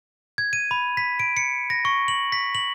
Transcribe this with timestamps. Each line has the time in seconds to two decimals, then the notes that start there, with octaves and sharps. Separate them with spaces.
0.38 G#6
0.53 D#7
0.71 B5
0.97 B6
1.20 D7
1.37 C#7
1.70 A#6
1.85 C#6
2.08 F#7
2.32 B6
2.55 F#7